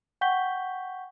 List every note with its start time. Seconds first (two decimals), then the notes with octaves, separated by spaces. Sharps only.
0.21 F#5 G5 C#6 G6 B6 G7